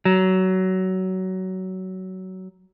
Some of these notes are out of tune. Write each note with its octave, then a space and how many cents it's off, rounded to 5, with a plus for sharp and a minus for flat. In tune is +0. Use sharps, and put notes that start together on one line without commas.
F#3 +20